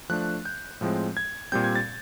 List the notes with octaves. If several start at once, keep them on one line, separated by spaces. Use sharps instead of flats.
F3 A3 D4 F#6
G6
A2 F3 G#3 C4
G#6
A#2 G3 C4 G6
G#6
A6